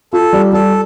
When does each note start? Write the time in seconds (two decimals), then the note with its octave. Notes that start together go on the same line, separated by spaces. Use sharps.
0.13 F4 A4
0.33 G3
0.53 G3 A4